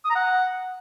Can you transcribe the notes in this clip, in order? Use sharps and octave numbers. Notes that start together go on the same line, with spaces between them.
D#6
A#5
F#5